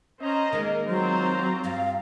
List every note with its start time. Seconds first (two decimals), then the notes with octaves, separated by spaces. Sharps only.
0.21 C#4 C5 D#5 A#5
0.53 D#3 G#3 A#3 G#4 A#4
0.88 F#3 C4 F4 C5 A#5
1.65 G2 F5